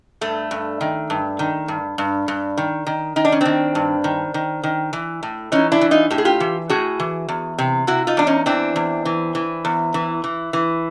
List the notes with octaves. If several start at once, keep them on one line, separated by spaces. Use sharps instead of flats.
G2 A3
G2
D#3
G2
D#3
G2
G2
G2
D#3
D#3
D#3 D#4
D4
C#4
D#3 C4 D4
G2
D#3
D#3
D#3
E3
A2
E3 C#4 D#4
D4 E4
E3
D#4 F4
A2 G4
G#4
F4 G4
E3
A2 F#4 G#4
E3
E2
C3
C3 E4 F#4
D#4 F4
E2 D4
C#4 D#4
E3 C4 D4
E2
E3
E3
E2
E3
E3
E3